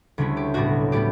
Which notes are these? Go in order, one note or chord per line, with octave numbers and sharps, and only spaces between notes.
D2 C#3 G3 C#4 E4
G4
B1 A2 G3 B3 F#4
A2 G3 B3 G4